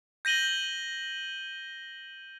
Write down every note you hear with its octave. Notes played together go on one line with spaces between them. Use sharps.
G6 A#6 D#7 F#7 G7